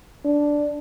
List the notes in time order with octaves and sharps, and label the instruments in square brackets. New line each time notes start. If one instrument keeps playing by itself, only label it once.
[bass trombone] D4